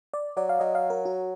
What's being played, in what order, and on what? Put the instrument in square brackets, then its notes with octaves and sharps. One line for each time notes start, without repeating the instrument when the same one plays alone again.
[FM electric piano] D5
[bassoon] F#3 [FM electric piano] D5
[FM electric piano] F5
[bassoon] F#3 [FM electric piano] D#5
[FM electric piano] F5
A#4
F#4